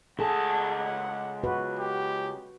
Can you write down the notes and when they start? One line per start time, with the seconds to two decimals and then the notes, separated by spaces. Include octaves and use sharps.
0.19 C#2 G#4 A4 F#5 A5
1.44 F#4 B4
1.79 G4